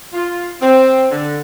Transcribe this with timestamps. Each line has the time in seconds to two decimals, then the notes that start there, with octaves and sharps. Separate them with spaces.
0.14 F4
0.62 C4
1.10 D3